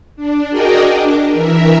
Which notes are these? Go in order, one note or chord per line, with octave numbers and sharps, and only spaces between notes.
D4
F#4 G#4 A#4 D5 D#5 G5
D4
E3 A#4 E5